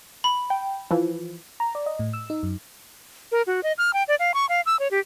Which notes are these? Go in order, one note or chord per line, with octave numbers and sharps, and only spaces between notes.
B5
G5
E3 F3
A#5
D5
D#5
A2
E6
D#4
F#2
A#4
F#4
D#5
F6
G5
D5
F5
C#6
F5
E6
C#5
G4